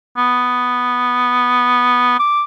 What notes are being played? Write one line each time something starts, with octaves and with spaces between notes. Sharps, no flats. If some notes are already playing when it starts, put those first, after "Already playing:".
B3
D6